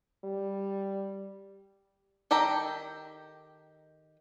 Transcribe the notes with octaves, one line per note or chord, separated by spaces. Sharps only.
G3
D#3 G4 A4 G5 A#5